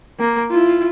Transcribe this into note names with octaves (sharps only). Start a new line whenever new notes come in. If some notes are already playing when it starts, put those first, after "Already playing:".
A#3
E4 F4